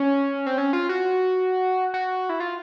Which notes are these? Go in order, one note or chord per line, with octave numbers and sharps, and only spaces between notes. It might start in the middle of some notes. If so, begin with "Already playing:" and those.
Already playing: C#4
C4
C#4
F4
F#4
F#4
E4
F4